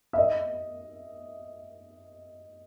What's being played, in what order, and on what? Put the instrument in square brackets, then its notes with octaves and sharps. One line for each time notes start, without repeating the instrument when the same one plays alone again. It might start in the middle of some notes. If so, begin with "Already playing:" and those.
[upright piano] E5
D#5